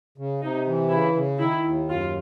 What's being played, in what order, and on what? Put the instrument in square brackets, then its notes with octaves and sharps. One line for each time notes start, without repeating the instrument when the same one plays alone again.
[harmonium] C#3
[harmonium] C3 [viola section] D#4
[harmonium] E3
[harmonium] C#3 [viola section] E4
[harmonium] C#3
[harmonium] D#3 [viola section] E4
[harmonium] D#2
[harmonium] F#2 [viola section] F4